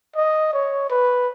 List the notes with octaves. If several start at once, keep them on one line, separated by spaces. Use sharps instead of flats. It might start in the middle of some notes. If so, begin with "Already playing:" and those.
D#5
C#5
B4